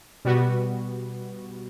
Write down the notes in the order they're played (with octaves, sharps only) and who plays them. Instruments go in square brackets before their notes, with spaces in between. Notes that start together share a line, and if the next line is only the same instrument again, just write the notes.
[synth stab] B2 G3 B3 F#4